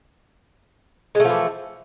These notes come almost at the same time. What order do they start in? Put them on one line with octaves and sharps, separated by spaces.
G#3 A3 F3 E3